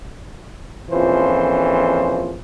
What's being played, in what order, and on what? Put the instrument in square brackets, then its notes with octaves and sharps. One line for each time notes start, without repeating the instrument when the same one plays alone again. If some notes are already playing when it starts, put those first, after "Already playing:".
[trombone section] A#1 F2 E3 F3 C#4 C5